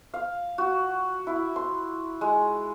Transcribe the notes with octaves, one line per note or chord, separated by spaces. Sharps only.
F5
F#4
E4
C6
G#3